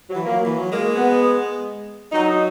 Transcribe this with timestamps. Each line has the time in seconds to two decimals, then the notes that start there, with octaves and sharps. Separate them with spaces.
0.09 F#3
0.15 E3
0.25 F#3 A#3
0.45 E3
0.58 F#3
0.72 G#3 A#3
0.95 B3
2.12 F#3 D#4